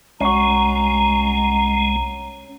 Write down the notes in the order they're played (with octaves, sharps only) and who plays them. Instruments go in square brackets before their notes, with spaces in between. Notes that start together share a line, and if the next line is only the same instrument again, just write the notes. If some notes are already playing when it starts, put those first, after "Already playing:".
[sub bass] C2 [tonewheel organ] G#3 [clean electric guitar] C#4 F#4 [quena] A#5